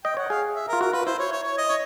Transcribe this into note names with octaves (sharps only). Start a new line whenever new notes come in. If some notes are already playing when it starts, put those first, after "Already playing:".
D#5 G5
C#5 F#5
G#4 F5
E5
A#4
F4
F#4 A#4
F4 B4
E4 C5
C#5
C#5
C#5
D#5
C#5